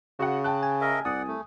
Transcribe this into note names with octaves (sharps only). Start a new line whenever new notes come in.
C#3 F#4 F#5
G5 A5 F#6
G#5
A#4 D#5 E5
C2 D5 F#5 D#6
A3